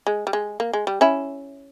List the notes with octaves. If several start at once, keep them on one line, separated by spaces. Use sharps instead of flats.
G#3
G3
G#3
A#3
G#3
G3
C#4 E4